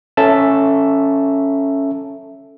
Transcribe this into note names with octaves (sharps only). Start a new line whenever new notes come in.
C#4 A4 E5 A5